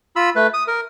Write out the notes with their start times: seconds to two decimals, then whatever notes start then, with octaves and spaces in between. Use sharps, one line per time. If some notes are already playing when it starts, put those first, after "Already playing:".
0.16 F4 B5 E6
0.36 A3 B4
0.54 D#6
0.68 A#4